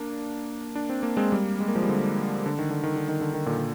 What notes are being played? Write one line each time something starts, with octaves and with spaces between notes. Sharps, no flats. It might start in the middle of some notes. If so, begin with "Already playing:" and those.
Already playing: A#3 D4
D4
C4
A#3
G#3 C4
G3 A#3
G#3
A#3
F3 G#3
G3
D3 F3
D3
D#3
D3
D#3
D3
D#3
D3
D#3
A#2 D3